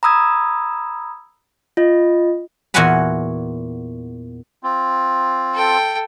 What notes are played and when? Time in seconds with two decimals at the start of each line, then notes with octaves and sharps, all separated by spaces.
0.03 A#5 B5 D#6 E6 G#6
1.77 F4 D#5
2.74 E2 A#2 F#4 F#5 G#5 B5
4.63 C4 F4
5.54 A4 G5